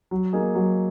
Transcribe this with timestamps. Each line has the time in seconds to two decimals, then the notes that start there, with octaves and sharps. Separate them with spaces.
0.11 F#3
0.33 A#3 D#4 G#4
0.55 F#3